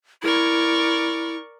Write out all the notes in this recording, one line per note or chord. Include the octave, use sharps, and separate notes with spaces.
E4 A#4 D5 C#6